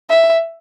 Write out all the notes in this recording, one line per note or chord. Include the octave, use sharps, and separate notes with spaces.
E5